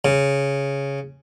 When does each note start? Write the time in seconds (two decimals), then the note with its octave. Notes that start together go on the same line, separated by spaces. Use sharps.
0.05 C#3